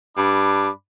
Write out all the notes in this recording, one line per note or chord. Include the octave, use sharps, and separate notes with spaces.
G2 D4 B5 D6